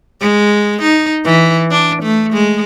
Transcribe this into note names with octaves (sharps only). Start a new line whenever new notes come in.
G#3
D#4
E3
D4
A3
G#3